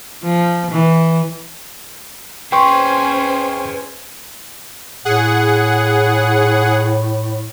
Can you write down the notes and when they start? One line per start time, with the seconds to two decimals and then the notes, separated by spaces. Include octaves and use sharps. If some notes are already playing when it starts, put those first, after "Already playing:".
0.23 F3
0.72 E3
2.52 C#4 G#4 B4 C5 G5 G#5 C6 C#6
5.05 A2 G#4 F#5